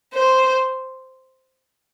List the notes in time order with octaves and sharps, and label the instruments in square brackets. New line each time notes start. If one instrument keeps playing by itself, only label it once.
[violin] C5